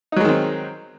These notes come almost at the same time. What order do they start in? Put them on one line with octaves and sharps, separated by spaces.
D#4 F#3 G#3 D#3 C4